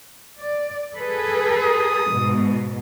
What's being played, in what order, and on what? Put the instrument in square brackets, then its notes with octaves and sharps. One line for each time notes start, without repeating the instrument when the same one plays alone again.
[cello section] D5
G#4 A4 B4
[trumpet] D#6
[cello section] G#2 B2